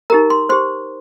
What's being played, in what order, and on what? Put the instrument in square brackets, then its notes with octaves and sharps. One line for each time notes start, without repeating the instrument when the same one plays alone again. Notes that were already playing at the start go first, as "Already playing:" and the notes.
[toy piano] D#4 G4 A#4 A#5
C6
G4 C5 C6